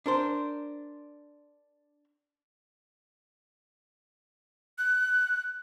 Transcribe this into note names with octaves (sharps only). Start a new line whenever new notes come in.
D4 A#4 C5
F#6